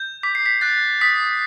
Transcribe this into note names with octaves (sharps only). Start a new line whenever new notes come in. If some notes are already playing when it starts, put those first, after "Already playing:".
Already playing: G6
D6 B6
C7
B6
F#6 A6
D#6 B6